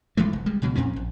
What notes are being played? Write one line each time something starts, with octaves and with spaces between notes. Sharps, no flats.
B1 E3 G#3 A3
F1
G3 G#3
C#2 B2 F#3
F2 A#2 C4 C#4
A#1